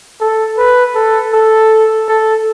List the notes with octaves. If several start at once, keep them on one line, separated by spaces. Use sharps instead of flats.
A4
B4
A4
A4
A4